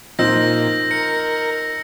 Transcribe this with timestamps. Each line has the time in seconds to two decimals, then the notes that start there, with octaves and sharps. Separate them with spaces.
0.19 A#2 F3 C4 D#4 E6 G6 A#6
0.91 A#4 C#7